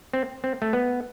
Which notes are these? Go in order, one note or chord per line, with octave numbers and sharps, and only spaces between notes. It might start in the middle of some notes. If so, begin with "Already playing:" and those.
C4
C4
A3
B3